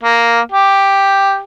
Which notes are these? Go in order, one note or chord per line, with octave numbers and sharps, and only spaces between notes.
A#3
G4